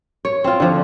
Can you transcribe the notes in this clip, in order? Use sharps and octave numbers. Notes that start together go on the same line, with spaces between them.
C#5
C4 F4
D3 F3